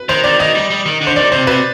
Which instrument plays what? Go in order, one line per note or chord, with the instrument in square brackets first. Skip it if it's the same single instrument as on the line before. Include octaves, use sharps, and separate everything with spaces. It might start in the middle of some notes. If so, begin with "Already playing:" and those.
Already playing: [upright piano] B4
[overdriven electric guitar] D#3 [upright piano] C5
[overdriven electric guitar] D#3 [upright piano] D5
[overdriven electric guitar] D#3 [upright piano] D#5
[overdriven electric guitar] G3
G3
D#3
D3
[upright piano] C5
[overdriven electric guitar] D#3 [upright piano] D5
[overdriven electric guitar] C3 [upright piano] C5
[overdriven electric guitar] C3 [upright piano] B4